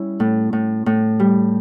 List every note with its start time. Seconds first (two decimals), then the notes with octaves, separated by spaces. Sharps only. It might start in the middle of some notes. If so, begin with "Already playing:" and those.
Already playing: G3 C#4 E4
0.20 A2
0.53 A2
0.86 A2
1.20 G3